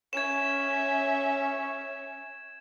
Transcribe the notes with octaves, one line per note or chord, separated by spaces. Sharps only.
C#4 E5 G#6 E7